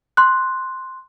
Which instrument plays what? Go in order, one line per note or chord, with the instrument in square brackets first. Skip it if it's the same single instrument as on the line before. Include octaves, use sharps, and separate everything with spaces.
[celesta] C6 F#6